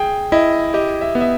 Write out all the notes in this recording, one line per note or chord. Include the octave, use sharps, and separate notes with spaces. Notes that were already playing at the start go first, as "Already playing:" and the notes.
Already playing: G#4 G5
E4 D#5
G4 D#5
E5
B3
E5